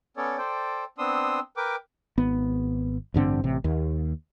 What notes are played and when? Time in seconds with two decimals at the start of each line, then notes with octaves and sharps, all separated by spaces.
0.17 B3 C#4 A4 C#5 D5
0.38 A4 C5 D5 G5
0.98 B3 C4 D4 C6 D#6 E6
1.57 A#4 B4 G5 D6
2.18 G#1 B3
3.14 A1 G2 D3 C4
3.44 A1 C3
3.64 D#2